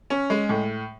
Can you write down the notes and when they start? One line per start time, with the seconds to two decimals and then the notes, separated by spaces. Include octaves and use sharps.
0.10 C#4
0.30 G#3
0.49 A2